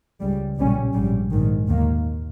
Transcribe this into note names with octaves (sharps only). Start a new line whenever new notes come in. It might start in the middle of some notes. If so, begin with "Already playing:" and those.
C#2 C#3 G3
B1 A#2 G3 C#4
A#1 G#2 G3
A#1 G#2 D#3
D#2 D#3 A#3